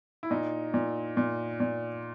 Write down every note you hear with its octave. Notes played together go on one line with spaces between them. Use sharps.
E4
A#2 D#4
A#2
A#2
A#2